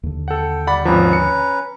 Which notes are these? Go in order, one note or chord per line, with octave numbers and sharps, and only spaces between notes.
D#2 D3
A4 F#5 G5
G3 D5 F#5 B5 A6
G#1 F3 C#4 B4 A#5
C#7